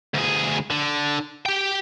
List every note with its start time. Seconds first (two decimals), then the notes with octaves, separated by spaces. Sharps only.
0.14 D2 G#4
0.70 D3
1.46 G4 G5